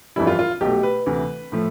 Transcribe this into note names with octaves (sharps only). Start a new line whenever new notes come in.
G1 F2 E3 G3 E4
F4
F4
B1 B2 A3 G4
B4
D2 C3 E3
A2 F3 A3